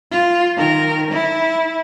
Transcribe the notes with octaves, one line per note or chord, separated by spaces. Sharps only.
F4
D#3 A#4
E4